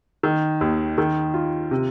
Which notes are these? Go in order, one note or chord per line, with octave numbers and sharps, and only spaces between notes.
D#3
D#2
D#3
F4
C3